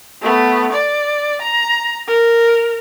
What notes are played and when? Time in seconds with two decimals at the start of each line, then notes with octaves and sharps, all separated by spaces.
0.22 A3 B3
0.73 D5
1.42 A#5
2.08 A#4